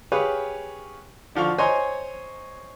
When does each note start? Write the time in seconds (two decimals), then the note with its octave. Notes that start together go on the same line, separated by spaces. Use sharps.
0.12 G4 G#4 B4 C#5 F5
1.35 D3 F3 F5 C#6
1.58 C5 C#5 D#5 G#5 A#5 C6